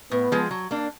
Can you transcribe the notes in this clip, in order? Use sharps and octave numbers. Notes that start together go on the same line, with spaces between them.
A2 B3
F3 G#3
F#3
A#3 D4